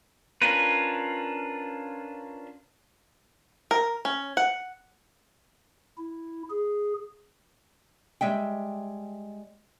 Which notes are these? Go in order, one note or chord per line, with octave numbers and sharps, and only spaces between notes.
C#4 D4 F4 A#4 B4
A#4
C#4
F#5
E4
G#4
G3 G#3 E5 G5